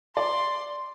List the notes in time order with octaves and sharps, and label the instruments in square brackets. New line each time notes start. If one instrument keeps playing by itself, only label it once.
[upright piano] D5 [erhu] C6